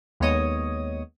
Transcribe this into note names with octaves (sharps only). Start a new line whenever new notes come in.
D#2 G#3 B3 C#5 D#5 D#6